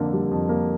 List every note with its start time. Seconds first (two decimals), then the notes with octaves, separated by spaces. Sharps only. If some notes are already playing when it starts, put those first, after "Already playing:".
Already playing: F2 D3 A#3
0.13 G3
0.31 F2
0.49 A#3